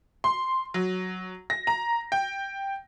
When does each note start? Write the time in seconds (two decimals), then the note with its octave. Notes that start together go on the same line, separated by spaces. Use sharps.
0.24 C6
0.74 F#3
1.50 A#6
1.67 A#5
2.12 G5